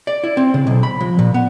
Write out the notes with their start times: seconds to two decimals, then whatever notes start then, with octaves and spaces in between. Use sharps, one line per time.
0.07 D5
0.24 E4
0.37 C4
0.54 C#3
0.67 B1
0.83 B5
1.01 F3
1.19 A#2
1.34 B3